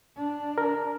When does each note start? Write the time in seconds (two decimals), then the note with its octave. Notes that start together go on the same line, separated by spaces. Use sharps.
0.17 D4
0.58 A#4